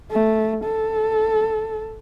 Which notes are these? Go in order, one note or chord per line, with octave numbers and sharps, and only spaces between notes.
A3
A4